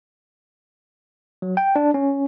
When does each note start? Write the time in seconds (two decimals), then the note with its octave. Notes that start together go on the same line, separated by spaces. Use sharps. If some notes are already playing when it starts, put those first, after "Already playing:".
1.42 F#3
1.57 G5
1.76 D4
1.94 C#4